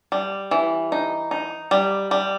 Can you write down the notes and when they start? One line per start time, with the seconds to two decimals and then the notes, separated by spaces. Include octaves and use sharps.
0.12 G3
0.51 E3
0.92 D#4
1.31 D#4
1.71 G3
2.11 G3